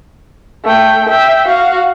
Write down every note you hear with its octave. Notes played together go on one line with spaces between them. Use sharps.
A3 G5
E5 G5
F#4 F5